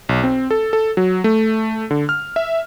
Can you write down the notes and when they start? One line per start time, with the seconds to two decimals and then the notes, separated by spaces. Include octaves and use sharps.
0.09 B1
0.24 C4
0.51 A4
0.73 A4
0.97 F#3
1.24 A3
1.91 D3
2.09 F6
2.36 E5